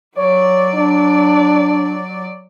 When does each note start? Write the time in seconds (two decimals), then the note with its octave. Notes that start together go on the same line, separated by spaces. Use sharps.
0.17 F#3 C#5 D5
0.74 D4